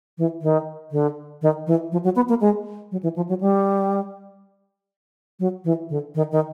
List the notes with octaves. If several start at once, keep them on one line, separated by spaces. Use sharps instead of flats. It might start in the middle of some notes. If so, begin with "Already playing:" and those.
E3
D#3
D3
D#3
E3
F3
F#3
B3
A#3
G#3
F#3
E3
F3
F#3
G3
F#3
E3
D3
D#3
D#3